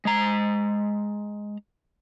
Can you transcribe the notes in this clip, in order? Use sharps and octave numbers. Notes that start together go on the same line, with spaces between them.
G#3 A#5